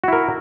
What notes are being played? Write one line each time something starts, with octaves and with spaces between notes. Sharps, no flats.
E4 F#4 A#4